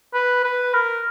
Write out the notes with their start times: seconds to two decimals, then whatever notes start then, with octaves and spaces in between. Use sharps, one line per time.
0.14 B4
0.44 B4
0.74 A#4